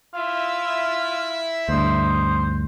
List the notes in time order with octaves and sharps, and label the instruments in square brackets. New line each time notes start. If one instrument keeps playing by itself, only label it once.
[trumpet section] E4 E5 [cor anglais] F4
[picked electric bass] D2 G2 [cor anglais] D#4 [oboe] C5